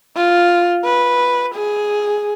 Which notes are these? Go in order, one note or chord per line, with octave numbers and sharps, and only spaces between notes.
F4
B4
G#4